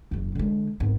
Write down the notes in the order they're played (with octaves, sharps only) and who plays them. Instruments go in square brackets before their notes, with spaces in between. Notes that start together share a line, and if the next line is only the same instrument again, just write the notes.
[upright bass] F#1 E2
D3 G#3
G#1 B3